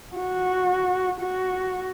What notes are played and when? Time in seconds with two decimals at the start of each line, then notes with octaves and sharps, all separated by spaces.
0.17 F#4
1.21 F#4